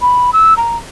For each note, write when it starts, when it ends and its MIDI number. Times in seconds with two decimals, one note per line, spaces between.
0.01 0.30 83
0.33 0.54 88
0.57 0.77 82